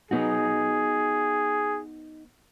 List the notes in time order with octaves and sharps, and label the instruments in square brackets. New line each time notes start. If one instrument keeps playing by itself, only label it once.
[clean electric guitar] B3 D#4 F#4 [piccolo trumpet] G#4